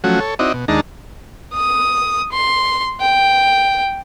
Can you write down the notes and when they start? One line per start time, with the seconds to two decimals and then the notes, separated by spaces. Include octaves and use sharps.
0.04 F3 F#3 A3 C#4 F#4
0.20 A4 C#5
0.39 C4 D#4 E4 F#4 D5 D#5
0.54 B2
0.68 D#2 G#3 D4 D#4 A5 A#5
1.54 D#6
2.32 C6
3.00 G5